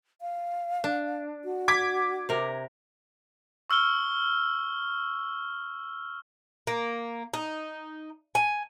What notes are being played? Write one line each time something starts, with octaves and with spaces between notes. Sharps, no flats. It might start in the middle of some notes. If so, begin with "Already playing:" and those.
F5
D4
F#4
D6 G#6 B6
C3 A#4
C#6 E6 F6 G7
A#3
D#4
G#5